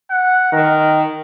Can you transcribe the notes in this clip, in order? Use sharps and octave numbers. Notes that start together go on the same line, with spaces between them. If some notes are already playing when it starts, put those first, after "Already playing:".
F#5
D#3 A#4